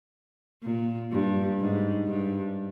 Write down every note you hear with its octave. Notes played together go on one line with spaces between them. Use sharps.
A#2
G2
G#2
G2